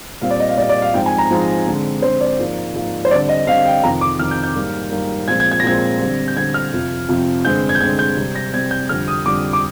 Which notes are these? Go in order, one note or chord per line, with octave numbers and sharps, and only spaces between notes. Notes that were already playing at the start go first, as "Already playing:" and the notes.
A#2 G3 C4 F5
D5
D#5
F5
A#2 G3 C4 D5
D5
F5
G#2 F3 G#3 C4 G5
G#5
A#5
G#2 F3 G#3 C4
D3 G#3 C4
D3 G#3 C4 C5
D5
G#2 F3 A#3
G#2 F3 A#3
C5
D3 G3 C4 D5
D#5
D3 G3 C4 F5
G5
F2 C3 D#3 A#5
D6
F2 C3 D#3 F6
G6
G6
G#2 G3 A#3
G#2 G3 A#3
A#2 F3 G#3 C4 G#6
G#6
G#6
A#6
A#2 F3 G#3 C4 G#6
D3 G3 C4
G6
D3 G3 C4 G#6
F6
F2 C3 F3
F2 C3 F3
G2 D3 G#3 C4 G6
G#6
G6
G2 D3 G#3 C4 G#6
G6
C3 G3 C4
A#6
C3 G3 C4 G#6
G6
F2 D3 G3 F6
D#6
F2 D3 G3 D6
D6